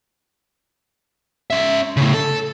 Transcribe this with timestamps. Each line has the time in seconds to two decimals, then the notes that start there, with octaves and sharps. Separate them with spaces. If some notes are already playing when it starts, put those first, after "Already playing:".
1.50 C#4 E5
1.97 A2 C#3
2.14 A4